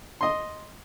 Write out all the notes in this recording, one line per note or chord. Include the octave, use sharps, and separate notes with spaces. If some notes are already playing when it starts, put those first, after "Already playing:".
D#5 C6